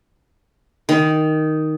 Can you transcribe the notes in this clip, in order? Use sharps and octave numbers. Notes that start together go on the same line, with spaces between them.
D#3